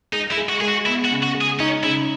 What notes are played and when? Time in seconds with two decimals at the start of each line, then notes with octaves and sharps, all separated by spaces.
0.13 G#3 D#4
0.31 E4
0.37 G#3
0.49 F#4
0.61 G#3 G#4
0.68 F#4
0.86 B3 E4
1.05 F#4
1.11 C#3
1.23 F#4
1.34 G#3
1.41 G#4
1.59 C#4 D#4
1.84 C#3 E4